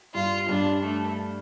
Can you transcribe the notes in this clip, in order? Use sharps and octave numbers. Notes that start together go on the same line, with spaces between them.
G2 F4
G2 D4
A3